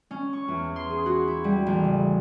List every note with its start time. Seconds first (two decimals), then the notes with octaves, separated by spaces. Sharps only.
0.11 C#4
0.33 C#6
0.48 E2
0.76 C6
0.90 G#4
1.06 F#4
1.27 E4
1.44 G3
1.67 A1
1.84 C#3